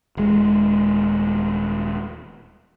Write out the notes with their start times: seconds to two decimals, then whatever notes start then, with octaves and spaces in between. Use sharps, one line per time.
0.17 D#1 G#3